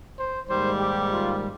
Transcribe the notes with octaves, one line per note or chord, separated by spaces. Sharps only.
C5
G#2 D#3 G3 A#3 C5
G4
F4